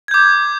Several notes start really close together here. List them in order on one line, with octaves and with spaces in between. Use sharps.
G#6 G6 D6